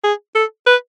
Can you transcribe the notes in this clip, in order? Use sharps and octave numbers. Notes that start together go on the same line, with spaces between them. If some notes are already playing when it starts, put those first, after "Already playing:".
G#4
A4
B4